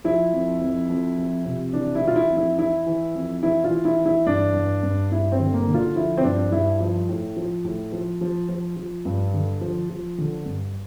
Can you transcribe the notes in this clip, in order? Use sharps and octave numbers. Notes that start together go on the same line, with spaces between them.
F3 E4
F2
F2
F2
F3
C3
E3 D4
E4
E3
F4
E4
F2
E4
E3 E4
E3
F2
E3 E4
F4
E3
E4
E3
E4
G2 D4
G2
G2
G2 E4
C4
D3
A#3
D3
F4
F3 E4
C4
G2 D4
G2 E4
F3
A2
F3
A2
F3
F3
F3
F3
G2
D3
F3
F3
D3
G2